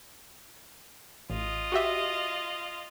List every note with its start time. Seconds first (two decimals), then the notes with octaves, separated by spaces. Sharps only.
1.30 A1 F4 D#5
1.72 F#4 G4 E5